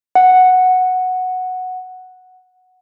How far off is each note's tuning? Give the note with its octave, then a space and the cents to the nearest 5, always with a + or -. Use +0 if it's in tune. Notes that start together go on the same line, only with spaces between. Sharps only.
F#5 -5